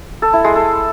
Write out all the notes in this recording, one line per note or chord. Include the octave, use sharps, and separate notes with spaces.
A4
E4
G#3
A4